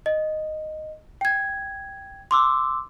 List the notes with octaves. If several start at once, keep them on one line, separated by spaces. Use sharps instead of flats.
D#5
G5 G#6
C6 D6 E6